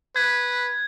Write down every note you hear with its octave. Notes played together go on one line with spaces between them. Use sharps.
B4 G#6